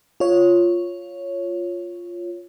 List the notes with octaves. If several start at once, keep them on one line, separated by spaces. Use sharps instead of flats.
F4 C#5